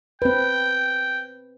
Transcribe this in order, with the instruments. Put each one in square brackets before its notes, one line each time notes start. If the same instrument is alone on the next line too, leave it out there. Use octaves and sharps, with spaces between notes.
[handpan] C4 B4 [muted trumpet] G5